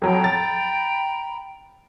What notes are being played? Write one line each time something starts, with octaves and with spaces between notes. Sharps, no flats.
F2 F#3 G5 A#5 B5
A6